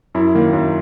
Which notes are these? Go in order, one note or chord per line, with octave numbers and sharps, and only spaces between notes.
F#2 E4
D#3 A#3
F#2